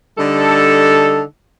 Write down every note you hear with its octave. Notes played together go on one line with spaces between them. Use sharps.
D3 G3 D#4 A4